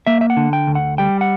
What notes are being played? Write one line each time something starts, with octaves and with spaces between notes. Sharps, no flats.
A#3 E5
E5
F#5
D3
G5
D2
F#5
G3 G5
F#5